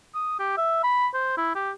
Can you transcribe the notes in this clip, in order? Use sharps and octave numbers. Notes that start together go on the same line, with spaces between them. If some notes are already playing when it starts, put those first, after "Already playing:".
D#6
G4
E5
B5
C5
E4
G4